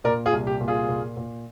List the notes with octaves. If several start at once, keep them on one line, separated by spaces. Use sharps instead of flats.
A#2 A#4 D5
F4 G#4
C2
G4
A#2
F4 G#4
A#2
A#2